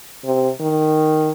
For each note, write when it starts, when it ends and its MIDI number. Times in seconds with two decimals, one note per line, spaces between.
0.25 0.49 48
0.60 1.32 51